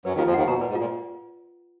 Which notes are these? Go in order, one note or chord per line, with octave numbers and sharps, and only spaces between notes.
F#2 F#3 B4
D#2 D#3
F4
F2 F3
D#2 D#3 F#5
B2 A#5
A#2
B4
G#2
A#2 F4